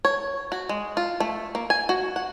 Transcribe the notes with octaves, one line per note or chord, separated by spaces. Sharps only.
C#5
F#4
G#3
F4
A3
A#3
G#5
F#4
F#5